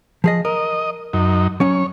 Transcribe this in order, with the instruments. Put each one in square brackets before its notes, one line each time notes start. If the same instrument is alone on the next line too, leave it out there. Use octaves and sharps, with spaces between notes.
[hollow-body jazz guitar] F3 G#4 D#5
[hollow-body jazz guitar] A#4 [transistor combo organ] D#5
[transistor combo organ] F#2 D#4
[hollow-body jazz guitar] F#3 C#4 [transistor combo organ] C#5